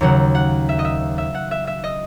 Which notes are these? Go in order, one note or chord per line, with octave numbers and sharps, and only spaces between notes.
D#2 C#3 F#3 F#5
F#5
E5
D#5
E5
E5
F#5
E5
E5
D#5